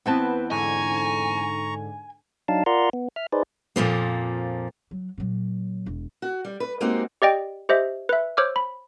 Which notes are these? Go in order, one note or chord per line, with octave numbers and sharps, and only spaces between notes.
E2 B3 C4 B4 A5
G#2 D3 G#5 A#5 C#6
F#3 D4 D#4 F5 A5
F4 A#4 D5 F#5 A#5 C6
B3
E5 F6
D#4 G#4 B4 C5 D5
F2 A#2 F3 A#3
F#3
A#2 F#3
E1
F#4
G3
B4
G#3 A#3 C4 D#4 F#4 G4
G4 D5 D#5 G5
G4 C5 D#5 E5
B4 E5
C5 C#5 D6 E6 F6
B5